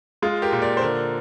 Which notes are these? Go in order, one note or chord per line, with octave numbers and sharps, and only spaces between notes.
G#3 F4 G#4
G4 A#4
A#2
A#4 D5
C5
D3 A#4 D5